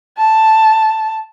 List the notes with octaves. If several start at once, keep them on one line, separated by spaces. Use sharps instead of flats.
A5